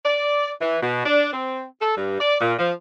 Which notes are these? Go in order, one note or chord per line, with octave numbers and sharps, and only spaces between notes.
D5
E3
B2
D4
C4
A4
G2
D5
A#2
F3